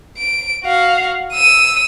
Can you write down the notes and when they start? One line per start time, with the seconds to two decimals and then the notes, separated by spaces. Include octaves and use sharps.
0.18 D7
0.64 F#4 F5
1.32 E6 D#7